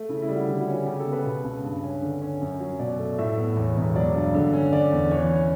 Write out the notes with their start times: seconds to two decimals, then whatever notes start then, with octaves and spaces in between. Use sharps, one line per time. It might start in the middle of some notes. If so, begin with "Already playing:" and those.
Already playing: A3
0.09 C#3 E4
0.22 E4
0.29 G3
0.36 F#4
0.48 D3 E4
0.61 F#4
0.67 C#4
0.74 F#4
0.86 C#3 G4
1.00 A4
1.06 B3
1.12 B4
1.26 B2
1.45 C#2
1.64 G2
1.83 C#4
2.02 D3
2.22 C#4
2.41 F#2
2.60 F#3
2.79 B2 D5
2.99 A3
3.18 A2 E5
3.38 B3
3.57 E2 C#5
3.76 E1
3.95 F#3 D5
4.15 G2
4.34 D3
4.53 C#4
4.73 D3 D5
4.92 E2
5.11 E3 C#5
5.30 C#4